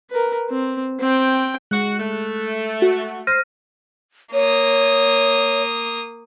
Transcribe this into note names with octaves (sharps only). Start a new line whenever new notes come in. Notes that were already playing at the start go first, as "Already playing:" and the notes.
A#4 B4
C4
C4 G5
G#3 F#4 F#6
A3
F#4
C5 F6 A#6 D#7
A#3 C#5 D#6